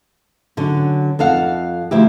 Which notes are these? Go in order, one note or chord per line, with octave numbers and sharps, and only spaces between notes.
D3 F#3 C#4
F2 A4 F5 F#5
D2 F3 E4 G4